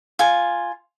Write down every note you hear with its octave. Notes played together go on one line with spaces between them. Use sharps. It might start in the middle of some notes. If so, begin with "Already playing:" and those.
F4 G#5